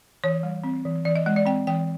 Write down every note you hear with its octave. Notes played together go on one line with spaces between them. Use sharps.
E3 C#5
G3
C4
E3
E3 D5
D#5
G#3 D#5
D5
C4 G5
E3 G5